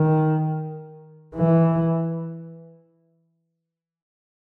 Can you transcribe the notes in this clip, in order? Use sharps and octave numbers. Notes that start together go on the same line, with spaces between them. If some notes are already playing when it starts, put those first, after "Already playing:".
Already playing: D#3
E3